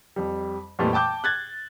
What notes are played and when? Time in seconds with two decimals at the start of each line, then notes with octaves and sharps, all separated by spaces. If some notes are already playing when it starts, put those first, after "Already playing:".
0.16 F2 G3
0.79 F2 A#2 E3 G3 A3
0.93 G5 A5 D6 G6
1.24 F#6 G#6 A6